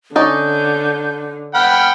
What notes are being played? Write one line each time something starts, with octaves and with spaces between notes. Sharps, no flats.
D3 C#4 D#4 D5 G6
F#5 G5 B5 F6